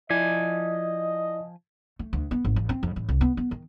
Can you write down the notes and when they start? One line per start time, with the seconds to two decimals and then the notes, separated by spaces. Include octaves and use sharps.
0.10 F3 E4 D5 D#5 G#5
1.99 A3
2.13 D2
2.31 B3
2.45 G#1
2.56 A1
2.69 C4
2.83 F2
2.96 A1
3.09 C2
3.21 B3
3.37 B3
3.51 D#3